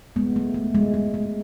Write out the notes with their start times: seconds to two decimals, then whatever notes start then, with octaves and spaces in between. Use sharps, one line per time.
0.16 G#3 B3
0.36 A3
0.54 A3
0.75 G#3
0.94 G#3
1.14 G#3